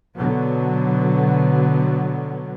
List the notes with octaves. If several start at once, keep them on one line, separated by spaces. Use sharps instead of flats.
B2 D3 F#3 B3